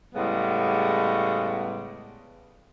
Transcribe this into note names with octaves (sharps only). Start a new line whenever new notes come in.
A2 C#3 G3 G#3 B3